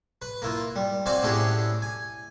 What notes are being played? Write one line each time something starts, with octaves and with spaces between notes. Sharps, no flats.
B4
A#3 E4 F4
G3
C4 F#4 C5 D5 F5 G#5
A2 C#4 D4 E4 G4 G#4
G#5